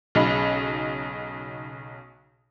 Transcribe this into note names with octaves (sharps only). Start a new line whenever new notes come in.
B1 C#3 D#4 D#5 B5